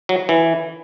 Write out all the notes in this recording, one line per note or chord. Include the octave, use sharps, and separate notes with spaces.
F#3
E3